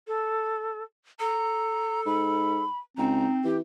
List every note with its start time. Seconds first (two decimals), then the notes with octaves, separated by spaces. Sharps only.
0.07 A4
1.20 A4 A#5
2.06 G#2 B5
2.98 C#2 C4 D#4 A#5
3.44 E3 G4